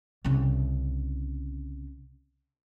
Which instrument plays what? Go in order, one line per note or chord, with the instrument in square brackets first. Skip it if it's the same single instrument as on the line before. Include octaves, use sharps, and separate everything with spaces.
[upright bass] C2 C#3